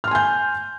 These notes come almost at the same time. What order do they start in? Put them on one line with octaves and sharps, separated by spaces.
F6 C6 G#5 G6